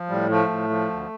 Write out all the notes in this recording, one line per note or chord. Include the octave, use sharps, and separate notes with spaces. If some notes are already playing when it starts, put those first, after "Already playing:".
Already playing: F3
A2 G3
F3 A3
A2
F3
D2